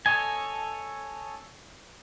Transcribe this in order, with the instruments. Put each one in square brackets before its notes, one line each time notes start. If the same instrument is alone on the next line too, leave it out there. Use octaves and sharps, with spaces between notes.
[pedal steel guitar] A4 C#5 D#5 G#5